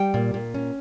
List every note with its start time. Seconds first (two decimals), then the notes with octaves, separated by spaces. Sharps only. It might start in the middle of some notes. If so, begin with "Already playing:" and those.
Already playing: G3 G5
0.14 A#2
0.34 A#2
0.54 C#4